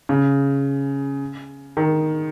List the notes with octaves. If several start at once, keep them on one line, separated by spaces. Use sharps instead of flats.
C#3
D#3